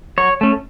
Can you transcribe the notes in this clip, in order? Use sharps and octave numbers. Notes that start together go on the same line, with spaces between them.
F#3 C#5
A3 C#4